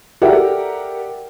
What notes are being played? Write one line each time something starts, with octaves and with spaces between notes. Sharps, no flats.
G4 A4 A#4 D5 E5 F#5